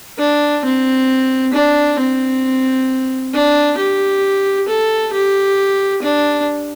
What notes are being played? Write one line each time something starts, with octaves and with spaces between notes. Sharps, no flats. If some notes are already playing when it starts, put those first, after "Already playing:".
D4
C4
D4
C4
D4
G4
A4
G4
D4